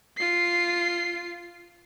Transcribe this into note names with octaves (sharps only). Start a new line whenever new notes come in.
F4 C7